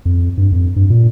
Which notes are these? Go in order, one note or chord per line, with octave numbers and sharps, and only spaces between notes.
F2
G2
F2
G2
A#2